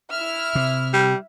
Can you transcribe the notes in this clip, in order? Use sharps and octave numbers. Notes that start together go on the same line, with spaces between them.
E4 E5 F6
C3
G3